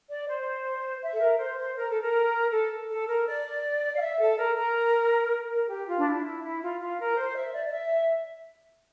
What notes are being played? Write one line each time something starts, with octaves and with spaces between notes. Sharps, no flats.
D5
C5
E5
A4
A#4
C5
C5
A#4
A4
A#4
A4
A4
A#4
D5
F5
E5
A4
A#4
A#4
A#4
G4
F4
D4
E4
E4
E4
F4
F4
A#4
C5
E5
D5
D5
E5